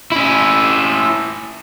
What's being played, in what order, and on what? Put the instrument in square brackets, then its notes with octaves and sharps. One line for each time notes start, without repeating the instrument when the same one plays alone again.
[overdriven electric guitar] C#4 E4